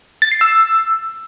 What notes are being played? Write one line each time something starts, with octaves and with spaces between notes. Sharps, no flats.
A6
C7
E6